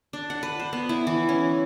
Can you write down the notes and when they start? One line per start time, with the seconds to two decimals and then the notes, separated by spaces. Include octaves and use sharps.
0.13 D4
0.30 F#5
0.43 B4
0.59 C5
0.73 B3
0.89 E4
1.07 E3
1.29 C#4